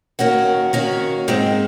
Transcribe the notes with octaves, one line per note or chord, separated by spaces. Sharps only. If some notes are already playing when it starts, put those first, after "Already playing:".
D#3 A#3 C#4 F#4
D#3 A#3 C#4 F#4
G#2 D#3 G#3 C4